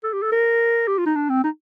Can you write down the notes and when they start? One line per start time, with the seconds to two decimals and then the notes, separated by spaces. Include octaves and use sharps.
0.04 A4
0.13 G4
0.22 A4
0.32 A#4
0.88 G4
0.98 F4
1.06 D#4
1.16 D4
1.30 C4
1.44 D#4